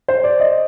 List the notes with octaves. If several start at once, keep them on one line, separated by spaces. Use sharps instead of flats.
C5
D5
D#5